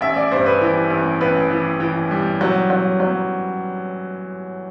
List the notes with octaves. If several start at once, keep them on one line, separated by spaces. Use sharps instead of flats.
A1 E5
D5
G2 C5
B4
E3
A1
A1 B4
E3
E3
G3
F#3
F#3
F#3